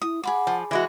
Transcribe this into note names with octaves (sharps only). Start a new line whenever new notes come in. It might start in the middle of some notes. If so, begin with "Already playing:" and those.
E4 D#6
G#4 F#5 B5 D6
F3
E3 G#3 F#4 E5